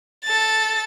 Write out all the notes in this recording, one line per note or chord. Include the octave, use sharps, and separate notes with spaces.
A4 A6